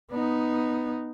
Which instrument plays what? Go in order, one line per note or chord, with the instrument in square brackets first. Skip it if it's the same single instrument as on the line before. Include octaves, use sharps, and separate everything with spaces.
[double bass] B3 D#4